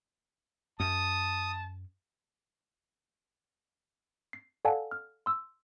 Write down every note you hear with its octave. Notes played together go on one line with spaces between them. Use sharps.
F#2 A5 D#6
C7
A4 D5 F5 F#5 G#5 A5
F6
C6 E6